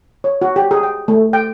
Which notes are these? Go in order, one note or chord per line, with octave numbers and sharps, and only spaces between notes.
C#5
F#4
G4
G#4
G5
A3
G5